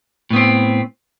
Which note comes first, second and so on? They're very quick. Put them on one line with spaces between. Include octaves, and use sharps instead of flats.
A2 B3 C4